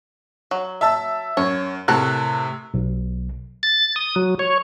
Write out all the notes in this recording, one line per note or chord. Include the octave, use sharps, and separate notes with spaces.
F#3
E5 A5 E6
F#2 C#5
A2 C3 A4 A#4 F#6
B1
A6
D#6
F#3
C#5